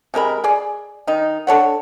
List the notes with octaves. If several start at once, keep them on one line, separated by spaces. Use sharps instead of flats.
C3 G#3 A#4 B5
G#4 D5
D#3 D#4
D4 A4 C#5 F#5